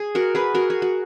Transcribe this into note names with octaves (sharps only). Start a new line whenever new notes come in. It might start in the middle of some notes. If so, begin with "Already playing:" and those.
Already playing: G#4
F#4 A#4
G#4 B4
F#4 A#4
G#4
F#4